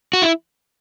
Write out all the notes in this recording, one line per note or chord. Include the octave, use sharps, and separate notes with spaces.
F#4
E4